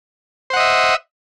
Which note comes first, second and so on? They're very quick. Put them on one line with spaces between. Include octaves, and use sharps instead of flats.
C5 F#5 D#5 E5